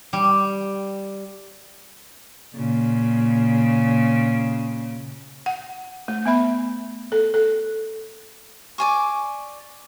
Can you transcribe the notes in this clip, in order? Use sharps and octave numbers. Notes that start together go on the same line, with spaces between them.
G3
A#2 C#3
F#5
A3
B3 E5 B5
A4
A4
D5 G#5 C#6